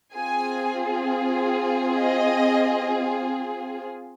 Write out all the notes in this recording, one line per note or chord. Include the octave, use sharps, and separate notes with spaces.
C4 F4 G#4 G#5
D#5